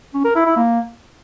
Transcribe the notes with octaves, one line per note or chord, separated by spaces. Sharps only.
C#4
A#4
E4
E4
A#3